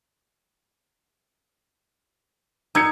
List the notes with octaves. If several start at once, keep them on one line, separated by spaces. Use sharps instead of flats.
D#4 E6 G#6 C#7